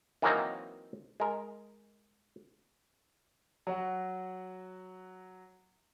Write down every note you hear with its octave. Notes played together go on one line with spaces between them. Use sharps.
D#3 E3 F#3 A#3 C4 D#4
G#3 A#4
F#3 F#4